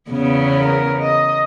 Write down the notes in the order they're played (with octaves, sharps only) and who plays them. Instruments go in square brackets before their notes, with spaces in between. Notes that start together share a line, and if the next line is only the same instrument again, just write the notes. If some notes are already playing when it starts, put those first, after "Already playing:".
[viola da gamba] E2 C#3 B3
[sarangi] A#4
D#5